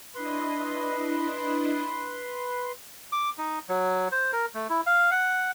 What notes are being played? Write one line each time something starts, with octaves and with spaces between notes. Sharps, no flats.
D4 E4 B4 D#5 C6
D6
D#4
F#3
C5
A#4
A3
E4
F5
F#5